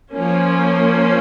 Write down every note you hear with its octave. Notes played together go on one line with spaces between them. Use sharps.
F3 A#3 C#4